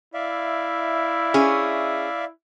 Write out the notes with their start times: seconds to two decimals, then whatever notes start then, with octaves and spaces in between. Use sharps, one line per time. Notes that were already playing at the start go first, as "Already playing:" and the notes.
0.14 E4 D5 E5 F5
1.34 C#4 G#4